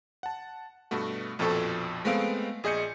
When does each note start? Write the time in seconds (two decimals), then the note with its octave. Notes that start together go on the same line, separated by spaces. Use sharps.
0.23 F#5 A5
0.91 G2 B2 A3 F#4
1.39 A#1 F2 B2 F3 A4 C#6
2.05 G#3 A3 B3 C4 F5 D7
2.64 A#1 G#4 D#5 G6 C#7